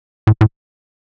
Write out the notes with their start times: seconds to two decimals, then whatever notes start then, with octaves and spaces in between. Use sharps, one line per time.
0.27 A2
0.41 A2